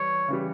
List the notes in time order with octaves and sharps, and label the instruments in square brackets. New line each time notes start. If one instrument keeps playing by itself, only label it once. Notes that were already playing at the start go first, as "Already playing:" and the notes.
Already playing: [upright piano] E3 G3 [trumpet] C#5
[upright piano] C#3 E3 G3